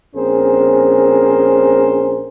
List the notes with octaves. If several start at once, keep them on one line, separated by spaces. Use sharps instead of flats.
A#1 C4 C#4 G#4 A#4 C5